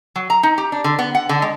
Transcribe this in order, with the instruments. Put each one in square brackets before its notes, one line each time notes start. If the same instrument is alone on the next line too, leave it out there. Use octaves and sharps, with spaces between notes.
[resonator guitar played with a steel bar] F#3
A#5
D#4
G4
D4
D3
B3
F#5
D3
G#3